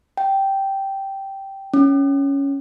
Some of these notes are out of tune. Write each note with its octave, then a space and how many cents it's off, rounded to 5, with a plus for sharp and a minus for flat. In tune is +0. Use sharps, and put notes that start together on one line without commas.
G5 -10
C#4 +5